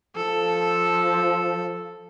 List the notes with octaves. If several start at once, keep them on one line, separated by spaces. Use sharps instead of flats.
F3 A4